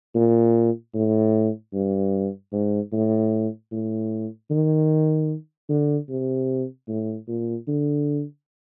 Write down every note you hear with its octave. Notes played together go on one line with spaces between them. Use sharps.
A#2
A2
G2
G#2
A2
A2
D#3
D3
C3
A2
A#2
D3